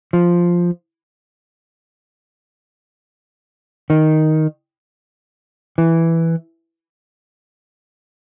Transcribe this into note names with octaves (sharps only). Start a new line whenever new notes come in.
F3
D#3
E3